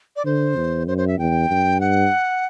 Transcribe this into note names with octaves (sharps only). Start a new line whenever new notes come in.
D5
D3 C5
E2
F#2 C5
C5
E5
E2 G5
F#2
G2 F#5